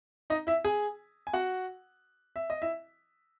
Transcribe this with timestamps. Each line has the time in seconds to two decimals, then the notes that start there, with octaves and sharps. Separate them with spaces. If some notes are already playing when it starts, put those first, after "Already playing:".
0.30 D#4 D#5
0.47 E4 E5
0.65 G#4 G#5
1.27 G#5
1.33 F#4 F#5
2.36 E5
2.50 D#5
2.62 E4 E5